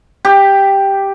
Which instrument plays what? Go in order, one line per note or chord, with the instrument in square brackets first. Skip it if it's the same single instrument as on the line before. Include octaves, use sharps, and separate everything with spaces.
[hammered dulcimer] G4